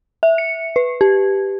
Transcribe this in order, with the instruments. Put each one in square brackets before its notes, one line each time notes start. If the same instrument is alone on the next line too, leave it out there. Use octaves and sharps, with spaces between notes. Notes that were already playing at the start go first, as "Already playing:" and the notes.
[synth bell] E5
C#7
B4
G4